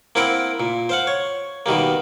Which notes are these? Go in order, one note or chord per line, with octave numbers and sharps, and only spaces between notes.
A#3 C4 E4 A#4 F#5 G5
A#2
C5 F5 F#5
C#5
B2 D#3 G3 A#3